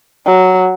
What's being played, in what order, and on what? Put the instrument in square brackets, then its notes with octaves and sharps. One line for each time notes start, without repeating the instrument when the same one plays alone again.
[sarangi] F#3